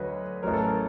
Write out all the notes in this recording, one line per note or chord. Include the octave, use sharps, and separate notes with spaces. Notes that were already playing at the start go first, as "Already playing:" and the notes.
Already playing: D2 D3 F#3 B4 C#5 D#5
A1 A2 F#3 A#4
A4
A#4